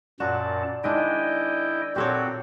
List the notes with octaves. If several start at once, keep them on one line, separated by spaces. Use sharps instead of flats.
F#2 A#2 F#4 D5 A5
D#3 G#3 D4 E4 D#5 G5
A#2 C4 F#4 G4 A4 C#5